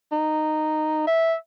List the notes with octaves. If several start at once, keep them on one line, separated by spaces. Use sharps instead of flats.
D#4
E5